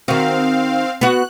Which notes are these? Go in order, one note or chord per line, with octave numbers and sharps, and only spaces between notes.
D#3 C4 F#4 F5
B3 F#4 F#6